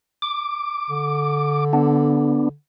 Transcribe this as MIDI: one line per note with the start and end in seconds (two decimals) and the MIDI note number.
0.22 1.64 86
0.90 2.54 50
1.73 2.49 59
1.73 2.49 62